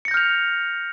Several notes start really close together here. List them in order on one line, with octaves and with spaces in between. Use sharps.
C#7 A#6 G6 F6 F7